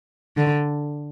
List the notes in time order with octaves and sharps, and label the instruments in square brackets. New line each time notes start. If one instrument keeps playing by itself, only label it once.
[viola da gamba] D3